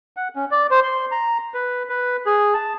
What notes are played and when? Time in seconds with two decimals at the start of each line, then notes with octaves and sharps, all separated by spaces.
0.17 F#5
0.36 C#4
0.51 D5
0.71 C5
0.83 C6
1.11 A#5
1.54 B4
1.89 B4
2.26 G#4
2.54 A5